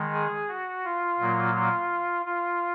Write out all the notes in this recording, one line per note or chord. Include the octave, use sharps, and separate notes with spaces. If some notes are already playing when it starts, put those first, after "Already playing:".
Already playing: D#3 G#3
G#4
F#4
F4
A#2 F#3 A#3
F4
F4